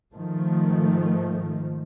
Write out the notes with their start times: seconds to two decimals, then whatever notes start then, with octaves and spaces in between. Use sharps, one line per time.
0.12 G#2 D#3 F3 A3